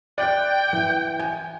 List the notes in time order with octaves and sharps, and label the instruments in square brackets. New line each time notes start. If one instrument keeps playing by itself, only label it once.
[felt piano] D5 F#6 [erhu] G5
[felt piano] E3
G#5